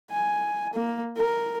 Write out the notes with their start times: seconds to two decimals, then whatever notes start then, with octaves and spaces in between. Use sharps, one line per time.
0.11 G#5
0.74 A#3
1.17 A#4